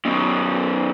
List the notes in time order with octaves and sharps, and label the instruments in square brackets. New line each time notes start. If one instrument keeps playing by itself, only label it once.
[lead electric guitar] F#2 B2